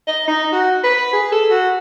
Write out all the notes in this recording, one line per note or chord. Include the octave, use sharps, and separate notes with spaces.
D#5
D#4
F#4
B4
G#4
A4
F#4